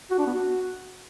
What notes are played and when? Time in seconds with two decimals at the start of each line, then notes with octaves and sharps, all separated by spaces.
0.11 F#4
0.19 D4
0.27 B3
0.35 F#4